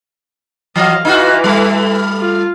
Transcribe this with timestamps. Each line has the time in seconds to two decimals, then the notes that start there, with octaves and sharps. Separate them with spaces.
0.76 E3 F#3 D#5 F5
1.05 E3 D#4 F4 F#4
1.44 G3 A3
2.21 F4